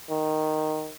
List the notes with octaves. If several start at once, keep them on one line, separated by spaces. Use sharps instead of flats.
D#3